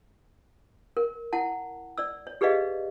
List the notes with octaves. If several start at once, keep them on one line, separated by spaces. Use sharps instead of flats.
A#4
E4 F#5 A5
D5 E6
C#5
G4 G#4 B4 D5 D#5 F5